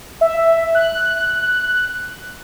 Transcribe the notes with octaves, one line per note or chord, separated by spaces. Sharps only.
E5
F#6